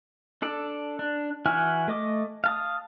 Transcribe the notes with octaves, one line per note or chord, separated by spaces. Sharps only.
D4 A4 D5
D4
E3 E4 F#4 G#5 F6
A3 D#5 D6
F5 A5 D#6